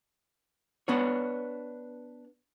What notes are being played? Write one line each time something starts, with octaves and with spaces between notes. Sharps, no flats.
B3 D4 C#5